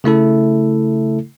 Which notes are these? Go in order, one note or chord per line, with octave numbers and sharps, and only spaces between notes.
C#3 A3 E4 A4